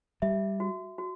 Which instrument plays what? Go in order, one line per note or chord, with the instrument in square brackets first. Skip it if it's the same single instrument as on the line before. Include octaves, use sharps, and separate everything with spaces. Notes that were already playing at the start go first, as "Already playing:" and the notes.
[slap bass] G3 [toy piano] E5
[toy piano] F#4
F#4